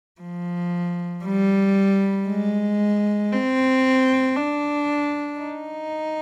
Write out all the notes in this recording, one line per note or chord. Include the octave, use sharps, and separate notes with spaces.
F3
G3
G#3
C4
D4
D#4